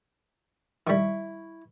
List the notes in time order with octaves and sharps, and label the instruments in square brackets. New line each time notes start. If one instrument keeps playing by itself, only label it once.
[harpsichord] D#3 G3 [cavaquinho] E4 C#6